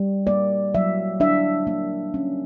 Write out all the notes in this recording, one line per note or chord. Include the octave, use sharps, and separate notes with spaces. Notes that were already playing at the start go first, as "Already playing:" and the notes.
Already playing: G3
A#3 D5
F#3 E5
D4 E5
A#3
C#4